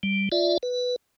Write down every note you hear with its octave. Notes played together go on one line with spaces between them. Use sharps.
G3
F4 D5 E5
B4